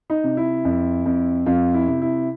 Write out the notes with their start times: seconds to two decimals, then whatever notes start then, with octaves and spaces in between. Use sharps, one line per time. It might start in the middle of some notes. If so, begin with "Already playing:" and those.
0.10 D#4
0.24 C3
0.37 E4
0.65 F2
1.06 F2
1.46 F2 F4
1.74 E4
1.88 C3
2.02 E4